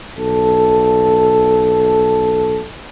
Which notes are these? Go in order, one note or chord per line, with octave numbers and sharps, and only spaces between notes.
B1 A4